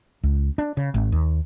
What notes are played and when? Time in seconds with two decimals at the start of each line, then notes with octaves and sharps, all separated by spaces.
0.23 C#2
0.58 D4
0.77 C#3
0.94 G#1
1.12 D#2